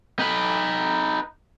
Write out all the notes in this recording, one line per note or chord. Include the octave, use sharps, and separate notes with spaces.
D#4 B4